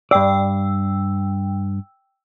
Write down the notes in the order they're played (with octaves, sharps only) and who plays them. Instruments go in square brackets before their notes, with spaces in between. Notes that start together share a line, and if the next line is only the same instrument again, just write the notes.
[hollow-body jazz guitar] G2 D5 [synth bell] G5 E6